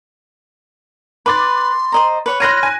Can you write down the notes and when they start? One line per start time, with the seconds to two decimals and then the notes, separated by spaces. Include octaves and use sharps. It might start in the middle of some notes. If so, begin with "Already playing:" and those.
1.26 B4 B5 C6 D6 A6
1.92 C5 D#5 A#5
2.26 B4 C#5 C#6
2.40 C#5 B5 C6 F6 F#6 A#6 D#7
2.63 G#5